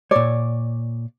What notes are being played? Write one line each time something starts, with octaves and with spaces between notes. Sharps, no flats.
A#2 C#5 D5